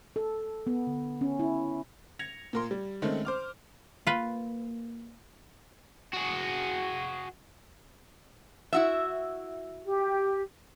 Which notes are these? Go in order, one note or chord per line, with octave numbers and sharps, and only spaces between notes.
A4
B3
D3
C#4
E4
G#6 A#6 C#7 F7
A#2 A#4 C6
G3
D#3 G#3 A3 C4 C#4
C5 D6 F6
A#3 F4 B4
F#4 G#4
E4 F#4 E5
G4